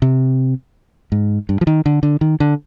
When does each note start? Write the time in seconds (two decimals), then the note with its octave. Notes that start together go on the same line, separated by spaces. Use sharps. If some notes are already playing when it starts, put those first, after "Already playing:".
0.02 C3
1.12 G#2
1.49 G2
1.61 F3
1.67 D#3
1.86 D3
2.03 D3
2.21 D#3
2.40 D3